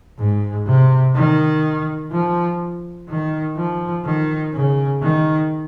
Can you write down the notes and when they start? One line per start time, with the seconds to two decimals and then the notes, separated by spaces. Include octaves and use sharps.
0.18 G#2
0.66 C3
1.15 D#3
2.12 F3
3.08 D#3
3.57 F3
4.05 D#3
4.53 C#3
5.02 D#3